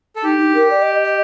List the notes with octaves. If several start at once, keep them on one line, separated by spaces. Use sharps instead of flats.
A4
D#4 G4
D#4
A#4
D5
D#5
D#5